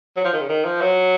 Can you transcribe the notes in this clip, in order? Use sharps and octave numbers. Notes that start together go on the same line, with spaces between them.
F#3
F3
D#3
C#3
D#3
F3
F#3